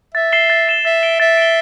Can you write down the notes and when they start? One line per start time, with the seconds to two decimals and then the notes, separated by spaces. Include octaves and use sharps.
0.15 E5 A6
0.32 C7 E7 G7
0.50 A6
0.68 C7 E7 G7
0.85 E5 A6
1.03 D7 G7
1.20 E5 A6
1.37 D7 G7